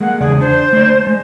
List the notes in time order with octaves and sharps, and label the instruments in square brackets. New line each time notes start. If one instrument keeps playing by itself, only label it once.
[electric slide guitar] G#3 A#3 [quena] F#5
[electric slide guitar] E2 C#3 D5 [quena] G#4
[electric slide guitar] D4 [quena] C5
[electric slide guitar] A3 D5
G#3